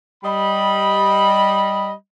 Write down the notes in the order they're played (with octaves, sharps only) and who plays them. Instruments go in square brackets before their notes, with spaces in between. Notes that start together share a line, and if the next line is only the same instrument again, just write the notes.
[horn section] G3 D#5 B5